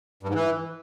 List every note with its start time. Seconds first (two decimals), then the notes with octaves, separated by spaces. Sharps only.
0.23 G2
0.29 G#2
0.35 E3